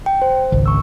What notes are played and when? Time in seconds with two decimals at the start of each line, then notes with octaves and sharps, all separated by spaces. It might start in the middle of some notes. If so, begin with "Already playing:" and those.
0.06 G5
0.22 C5
0.52 G#1 C#2
0.66 C#6 E6